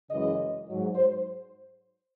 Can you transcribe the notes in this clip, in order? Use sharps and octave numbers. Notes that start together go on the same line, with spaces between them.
F#2 C#3 E3 G#3 D#5
G#2 F#3
C5